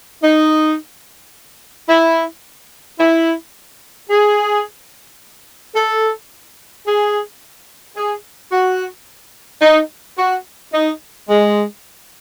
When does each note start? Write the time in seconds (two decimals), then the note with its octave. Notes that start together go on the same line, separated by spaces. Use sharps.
0.23 D#4
1.89 E4
2.99 E4
4.10 G#4
5.75 A4
6.86 G#4
7.97 G#4
8.52 F#4
9.62 D#4
10.18 F#4
10.73 D#4
11.29 G#3